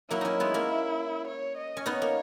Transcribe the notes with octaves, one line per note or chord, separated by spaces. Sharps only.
F#3 A#3 E4
A#3 C#4 D#4
G#3 B3
A#3 C#4
C#5
D#5
C#4
B3 D#4 C#5
A#3